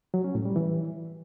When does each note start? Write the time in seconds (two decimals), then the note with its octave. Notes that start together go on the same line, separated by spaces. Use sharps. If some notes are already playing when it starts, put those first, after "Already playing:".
0.14 F#3
0.24 C#4
0.35 A2
0.45 G3
0.56 E3